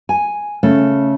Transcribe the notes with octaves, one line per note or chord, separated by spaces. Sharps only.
G#5
C#3 A3